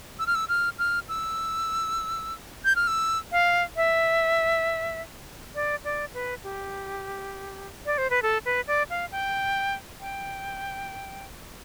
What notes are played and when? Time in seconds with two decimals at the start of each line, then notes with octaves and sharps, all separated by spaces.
0.19 E6
0.27 F6
0.35 E6
0.49 F6
0.79 F6
1.09 E6
2.65 G6
2.76 F6
2.87 E6
3.32 F5
3.76 E5
5.55 D5
5.84 D5
6.14 B4
6.44 G4
7.86 D5
7.98 C5
8.10 B4
8.22 A4
8.45 B4
8.67 D5
8.90 F5
9.12 G5
10.01 G5